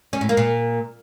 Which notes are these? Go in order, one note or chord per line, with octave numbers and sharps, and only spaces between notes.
C#4
A2
A#3
A#2